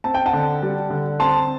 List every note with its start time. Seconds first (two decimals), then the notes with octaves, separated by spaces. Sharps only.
0.04 C4 A5
0.14 G5
0.26 F#5 A5
0.33 D3
0.62 G3
0.90 D3
1.20 C4 A5 C6